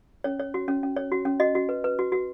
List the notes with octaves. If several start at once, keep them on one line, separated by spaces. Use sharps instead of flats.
C#4 C#5
C#5
F#4
C#4
C#4
C#5
F#4
C#4
F#4 D#5
F#4
B4
B4
F#4
F#4